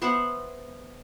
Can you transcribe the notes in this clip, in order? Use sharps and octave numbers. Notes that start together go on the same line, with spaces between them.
B3 C5 E5 F#5